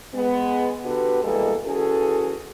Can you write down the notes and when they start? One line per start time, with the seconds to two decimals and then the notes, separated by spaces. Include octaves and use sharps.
0.15 G#3 B3
0.85 D3 B3 F#4 G4 B4
1.24 B2 E3 G3 G#3 A#3 A4
1.66 E3 C#4 F#4 G#4 A4